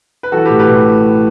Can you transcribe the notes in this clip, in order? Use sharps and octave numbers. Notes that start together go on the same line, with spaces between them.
B4
E3 F#4 A4
A2 G4 B4
G4 B4
A2